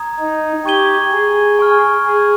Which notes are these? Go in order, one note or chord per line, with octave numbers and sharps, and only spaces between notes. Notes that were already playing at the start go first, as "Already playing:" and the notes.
Already playing: A#5 D#6 G#6
D#4
G4 C#6 G#6 D#7 G7
G#4
G#5 C#6 F6
G#4